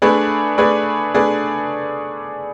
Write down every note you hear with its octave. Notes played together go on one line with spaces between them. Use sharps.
A3 D4 G#4 B4 D5
A3 D4 G#4 B4 D5
A3 D4 G#4 B4 D5